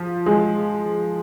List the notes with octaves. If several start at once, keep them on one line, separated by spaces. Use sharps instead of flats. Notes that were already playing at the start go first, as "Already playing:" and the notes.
Already playing: F3
G#3